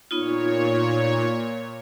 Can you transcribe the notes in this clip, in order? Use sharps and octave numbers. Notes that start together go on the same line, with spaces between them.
A#2 B3 D#4 F4 C#5